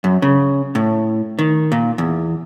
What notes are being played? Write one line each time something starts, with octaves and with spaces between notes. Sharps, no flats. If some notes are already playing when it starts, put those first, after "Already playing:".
F#2
C#3
A2
D#3
A#2
E2